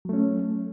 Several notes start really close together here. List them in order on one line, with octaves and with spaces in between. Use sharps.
F#3 A3 C#4